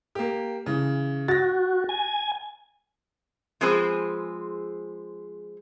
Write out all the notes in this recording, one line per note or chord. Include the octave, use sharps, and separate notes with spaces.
A#3 G4
C#3 E3
F#4 A6 A#6
G#5
F3 G#3 C4 G#4 B4 C5